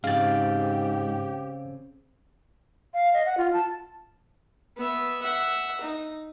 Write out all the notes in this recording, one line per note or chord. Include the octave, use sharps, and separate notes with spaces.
G#2 C#3 C4 G4 F5 A6
F5
D#5
F#5
F4
A5
B3 E5
E5 F#5
D#4